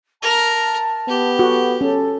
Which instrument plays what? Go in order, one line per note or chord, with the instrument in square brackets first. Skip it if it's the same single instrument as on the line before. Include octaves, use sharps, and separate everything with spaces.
[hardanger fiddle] A#4 [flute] A5
[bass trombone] B3 [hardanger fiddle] G4
[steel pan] F#4 [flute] A4
[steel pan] C#4 [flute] A4